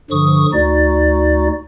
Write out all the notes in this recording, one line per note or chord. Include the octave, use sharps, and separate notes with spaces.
G2 D3 F3 C#6 D#6
D2 D#4 F#4 D5 A6